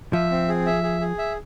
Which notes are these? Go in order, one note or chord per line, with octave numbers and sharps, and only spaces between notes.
F3 E5
C4
G#4
E5
G#4
G#4
E5